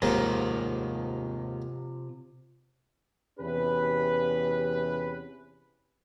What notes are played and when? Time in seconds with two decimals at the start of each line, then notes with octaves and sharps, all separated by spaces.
0.02 D#2 G#2 C3 D#3 F4
3.39 E2 C3 C#4 G4 B4